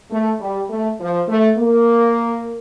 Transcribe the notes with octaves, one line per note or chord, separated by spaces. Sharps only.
A3
G3
A3
F3
A3
A#3